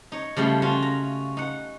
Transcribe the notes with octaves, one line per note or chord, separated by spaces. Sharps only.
D#4 C#5
C#3 F3 G3 A3
C#4 F4 F#4
A#5
D#4 F#5